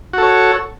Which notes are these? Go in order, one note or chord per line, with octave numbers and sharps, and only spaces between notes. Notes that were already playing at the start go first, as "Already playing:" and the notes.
F#4 A4 C#5